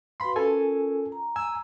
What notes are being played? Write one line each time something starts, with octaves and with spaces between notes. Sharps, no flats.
F#4 B4 F5 B5 C6
C#4 F4 A4 A#4 G#5
A#5
G#5 E6